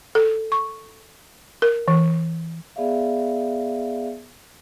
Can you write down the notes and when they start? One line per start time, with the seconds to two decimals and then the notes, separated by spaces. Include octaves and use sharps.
0.15 A4
0.52 C#6
1.62 A#4
1.88 E3
2.76 B3 G#4 D5 E5 F5